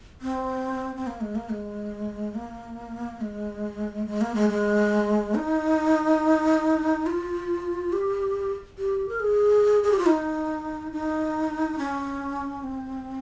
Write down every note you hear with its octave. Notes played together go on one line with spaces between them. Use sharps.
C4
C4
A#3
G#3
A#3
G#3
A#3
G#3
G#3
A#3
G#3
G#3
D#4
F4
G4
G4
A#4
G#4
G#4
G4
F4
D#4
D#4
C#4
C4